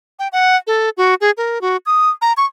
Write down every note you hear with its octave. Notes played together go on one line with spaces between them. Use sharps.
G5
F#5
A4
F#4
G#4
A#4
F#4
D#6
A#5
C#6